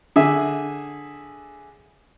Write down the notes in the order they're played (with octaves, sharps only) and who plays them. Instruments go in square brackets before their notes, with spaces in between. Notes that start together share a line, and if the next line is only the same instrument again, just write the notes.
[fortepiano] D3 G#4 E5